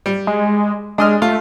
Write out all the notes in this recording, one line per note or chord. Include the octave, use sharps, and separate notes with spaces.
G3
G#3
G#3 D4 D#5 F6
A3 F4